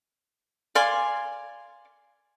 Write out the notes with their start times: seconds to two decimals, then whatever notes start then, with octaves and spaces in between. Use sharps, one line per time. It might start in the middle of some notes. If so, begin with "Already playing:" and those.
0.75 D5 F5 G#5 C6